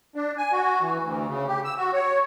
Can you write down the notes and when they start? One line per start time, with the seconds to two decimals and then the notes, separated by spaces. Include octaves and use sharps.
0.15 D4
0.38 G#5
0.52 F#4
0.81 E3
1.02 D2
1.28 C#3
1.48 G4
1.64 E6
1.78 F#4
1.93 C#5